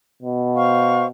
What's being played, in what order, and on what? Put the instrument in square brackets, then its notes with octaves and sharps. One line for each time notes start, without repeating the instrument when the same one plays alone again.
[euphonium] B2
[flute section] C5 F5 C#6